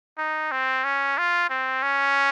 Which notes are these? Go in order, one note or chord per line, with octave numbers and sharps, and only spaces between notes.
D#4
C4
C#4
F4
C4
C#4